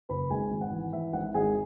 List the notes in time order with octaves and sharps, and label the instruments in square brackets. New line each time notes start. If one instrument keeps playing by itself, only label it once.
[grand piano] F#1 B4 B5
G#1 G#4 G#5
G#1
F#5
E3
E3 E5
G#1 F#5
G#1 G#4 G#5